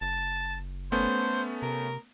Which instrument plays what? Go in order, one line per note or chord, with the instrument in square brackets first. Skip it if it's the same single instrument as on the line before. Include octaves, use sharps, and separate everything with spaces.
[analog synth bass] F#1 [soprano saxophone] A5
[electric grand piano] A3 B3 C#4 [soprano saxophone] C5
[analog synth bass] C3 [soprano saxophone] A#4